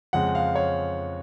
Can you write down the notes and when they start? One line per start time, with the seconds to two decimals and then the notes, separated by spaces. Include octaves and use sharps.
0.13 F2 C#3 G#3 C#4 F#5
0.35 F5
0.55 C#5